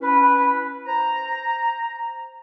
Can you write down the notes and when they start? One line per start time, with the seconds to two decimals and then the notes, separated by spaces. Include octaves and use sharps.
0.01 C#4 E4 B4
0.86 C5 A#5